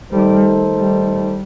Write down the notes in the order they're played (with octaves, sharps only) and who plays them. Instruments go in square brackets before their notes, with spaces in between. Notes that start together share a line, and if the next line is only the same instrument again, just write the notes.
[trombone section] D#3 A3 D#4 A4 C5 [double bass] G3
[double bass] G3